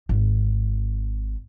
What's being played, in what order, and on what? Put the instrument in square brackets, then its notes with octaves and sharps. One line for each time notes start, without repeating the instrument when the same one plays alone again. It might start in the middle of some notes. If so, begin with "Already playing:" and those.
[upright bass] G#1